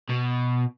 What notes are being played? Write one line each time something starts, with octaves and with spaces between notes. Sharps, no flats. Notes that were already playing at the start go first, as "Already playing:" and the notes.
B2